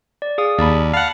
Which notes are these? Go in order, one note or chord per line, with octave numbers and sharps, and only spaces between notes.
D5
G#4 F5 D#6
D#2 D5 A5 B5
F5 F#5 A5 B5 A6